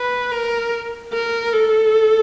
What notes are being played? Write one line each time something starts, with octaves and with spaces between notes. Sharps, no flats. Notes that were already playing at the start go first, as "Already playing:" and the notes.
Already playing: B4
A#4
A#4
A4